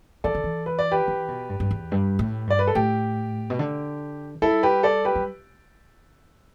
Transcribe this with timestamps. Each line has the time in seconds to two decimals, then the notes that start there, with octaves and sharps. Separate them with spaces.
0.24 E3 A4 D5
0.35 D3
0.44 E3
0.66 B4
0.79 D5
0.91 G4 B4
1.08 E3
1.28 B2
1.50 G2
1.60 G2
1.71 E2
1.92 G2
2.19 A2
2.47 G2 D5
2.59 B4
2.67 A4
2.75 A2 G4
3.50 B2
3.59 D3
4.42 G3 E4 A4
4.63 G4 B4
4.83 A4 D5
5.05 G4 B4
5.16 G3